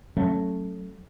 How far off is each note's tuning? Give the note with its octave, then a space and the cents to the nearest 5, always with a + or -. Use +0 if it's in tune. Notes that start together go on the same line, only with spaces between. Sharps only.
F#3 +0 A3 +0 C#4 -20